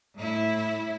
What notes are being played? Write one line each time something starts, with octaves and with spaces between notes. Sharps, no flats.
A2 E4